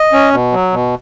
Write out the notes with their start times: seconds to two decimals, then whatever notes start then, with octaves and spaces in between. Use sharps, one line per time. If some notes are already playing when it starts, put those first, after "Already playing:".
Already playing: D#5
0.13 C#4
0.32 B2
0.52 F#3
0.72 B2